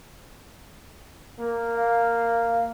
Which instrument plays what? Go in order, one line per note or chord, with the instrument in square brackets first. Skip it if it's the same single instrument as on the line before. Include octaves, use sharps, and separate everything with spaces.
[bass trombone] A#3
[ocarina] F5